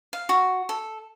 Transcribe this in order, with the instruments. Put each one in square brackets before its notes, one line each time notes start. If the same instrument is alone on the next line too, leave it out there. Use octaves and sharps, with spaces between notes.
[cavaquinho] F5
F#4
A4